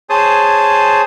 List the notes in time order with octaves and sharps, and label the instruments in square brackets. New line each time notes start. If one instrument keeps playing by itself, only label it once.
[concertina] G#4 C5 C#5 A5 D#6